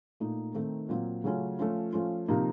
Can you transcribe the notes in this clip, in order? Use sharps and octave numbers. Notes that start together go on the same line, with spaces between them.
A#2 A3 D#4
D#3 A3 C4 D#4
A#2 F#3 C4 F4
C#3 F#3 A3 C#4 F4
F3 A3 C#4 F4
F3 A3 C#4 F4
C3 F3 A#3 D#4